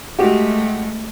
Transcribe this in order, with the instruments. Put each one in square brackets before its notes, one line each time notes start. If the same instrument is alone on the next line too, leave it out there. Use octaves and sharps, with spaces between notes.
[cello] G#3 A3 [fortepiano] F#4 G4